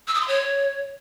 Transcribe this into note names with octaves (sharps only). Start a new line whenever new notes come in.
E6
D#6
C6
C#5